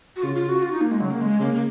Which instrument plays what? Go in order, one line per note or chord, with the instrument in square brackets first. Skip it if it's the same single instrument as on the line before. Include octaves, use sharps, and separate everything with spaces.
[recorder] F#4
[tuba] C#3 [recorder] F4
[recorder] F4
F#4
F4
D#4
A#3
G#3
[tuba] C#3 [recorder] F#3
[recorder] A#3
G#3
[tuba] C#3 [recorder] A#3
[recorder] A#3